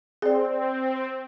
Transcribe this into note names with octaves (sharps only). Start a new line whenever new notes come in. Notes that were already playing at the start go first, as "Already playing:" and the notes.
C4 G#4 D5